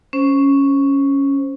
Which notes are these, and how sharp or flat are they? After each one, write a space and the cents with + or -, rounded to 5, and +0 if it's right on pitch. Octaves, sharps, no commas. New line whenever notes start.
C#4 +0 C5 +0